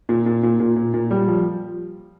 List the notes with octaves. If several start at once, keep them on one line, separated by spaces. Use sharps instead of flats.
A#2
A#2
A#2
A#2
A#2
A#2
G3
F3